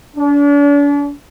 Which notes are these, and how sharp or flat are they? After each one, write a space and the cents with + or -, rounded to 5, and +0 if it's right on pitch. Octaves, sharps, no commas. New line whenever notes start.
D4 -40